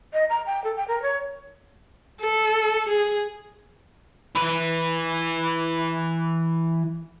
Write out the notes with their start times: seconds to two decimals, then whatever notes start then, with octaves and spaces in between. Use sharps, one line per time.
0.13 D#5
0.29 A#5
0.46 G5
0.64 A4
0.76 G5
0.88 A#4
1.02 C#5
2.21 A4
2.89 G#4
4.36 E3 B4